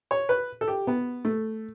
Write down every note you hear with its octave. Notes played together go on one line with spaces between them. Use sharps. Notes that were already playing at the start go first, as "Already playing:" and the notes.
C#5
B4
A4
G4
B3
A3